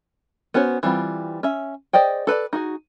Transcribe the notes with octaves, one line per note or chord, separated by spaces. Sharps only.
B3 C#4 F#4 C5 C#5
E3 G3 C4 F4
C#4 E5
G#4 C5 D5 D#5 G5
A4 B4 C5 D5
D#4 F#4 G#4